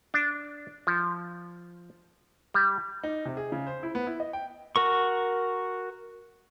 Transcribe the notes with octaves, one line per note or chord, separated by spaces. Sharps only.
D4
F3
G3
D#4
C3
G#4
C#3
C5
E4
B3
E4
D#5
G5
F#4 A#4 C#6